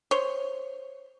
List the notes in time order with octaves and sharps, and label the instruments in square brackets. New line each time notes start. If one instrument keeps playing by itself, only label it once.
[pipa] C5 C#5